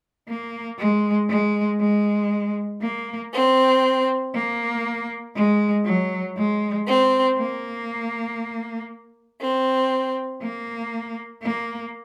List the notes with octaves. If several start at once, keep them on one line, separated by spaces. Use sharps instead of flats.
A#3
G#3
G#3
G#3
A#3
C4
A#3
G#3
F#3
G#3
C4
A#3
C4
A#3
A#3